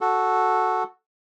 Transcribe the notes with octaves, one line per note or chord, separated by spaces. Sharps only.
F#4 A4